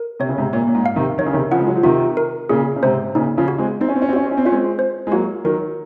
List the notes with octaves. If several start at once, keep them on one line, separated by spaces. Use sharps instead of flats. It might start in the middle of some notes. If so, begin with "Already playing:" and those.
Already playing: A#4
C3 C#5
C#3
G#2 C3
A#2 C#5
A#2
G#2
F5
C3 D#3
D#3 C#5
C#3
C3 D#3
C#3 F3 F#5
G#3
F#3
F3
C3 D#3 F4
A#4
A#2 C#3 G#4
C#3
G#2 C3 C5
A#2 C#3 D#4
C#3 F3
F#4
G#3 C4
C4 D#4
C#4
C4
C#4
C4
C#4 F#4
C4
C#4
C4
C#4 F4
G#3 C4
C5
G#3
F#3 A#3 F#4
D#3 F#3 A#4